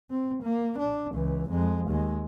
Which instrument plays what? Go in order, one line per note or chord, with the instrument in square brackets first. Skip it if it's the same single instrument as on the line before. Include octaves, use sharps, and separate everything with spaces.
[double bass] C4
A#3
D4
C#2 E3
F2 G#3
D#2 G#3